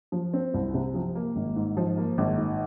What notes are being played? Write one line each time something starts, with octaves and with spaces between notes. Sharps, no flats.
F3
C4
C2
C3
F3
A#3
G#1
G#2
F3
A#3
G#1
G#2